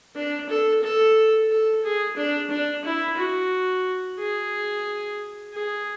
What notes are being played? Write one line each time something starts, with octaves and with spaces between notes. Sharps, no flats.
D4
A4
A4
A4
G#4
D4
D4
E4
F#4
G#4
G#4